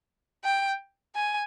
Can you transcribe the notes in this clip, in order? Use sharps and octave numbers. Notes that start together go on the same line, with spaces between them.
G5
G#5